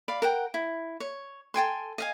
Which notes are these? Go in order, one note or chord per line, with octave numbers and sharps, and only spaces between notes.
D5 F5 B5
A#4 F#5 G5
E4
C#5
A4 G5 G#5 C6
D#5 F5 G#5